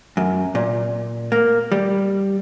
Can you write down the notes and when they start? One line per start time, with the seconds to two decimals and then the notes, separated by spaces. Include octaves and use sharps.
0.17 F#2
0.55 A#2
1.32 A#3
1.72 G3